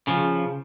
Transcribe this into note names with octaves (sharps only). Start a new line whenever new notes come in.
C#3 F3